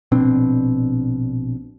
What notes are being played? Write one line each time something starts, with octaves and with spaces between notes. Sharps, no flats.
A#1 B2 C4 D4